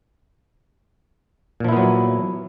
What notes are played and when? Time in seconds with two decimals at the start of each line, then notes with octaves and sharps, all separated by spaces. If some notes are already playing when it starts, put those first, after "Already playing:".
1.60 A#2
1.64 F3
1.68 E4
1.73 B3
1.77 F#3